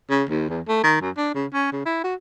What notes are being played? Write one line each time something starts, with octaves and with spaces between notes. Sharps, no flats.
C#3
D#2
E2
A3
D#3
F#2
D4
C#3
C#4
C#3
E4
F#4